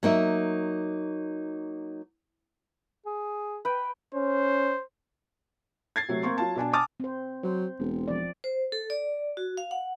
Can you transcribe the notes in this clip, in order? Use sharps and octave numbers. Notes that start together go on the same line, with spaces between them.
F#3 A#3 D#4 E5
G#4
B4 G5
C#4 C5
G#6 A6 C7
C3 F#3 A3
A#3 C4 C6 C#6
F#3 F4 A5
B2 D4 G#5 A5
G#5 A5 D6 D#6 F6 A6
C4 C5
F#3 C5
E1 C4
F3 D5
C5
A4
D5
F#4
F5
F#5